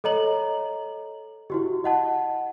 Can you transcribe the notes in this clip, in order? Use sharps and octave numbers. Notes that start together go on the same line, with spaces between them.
A4 C#5 D#5 A#5 F#7
E4 F#4 G4
D#5 F#5 A5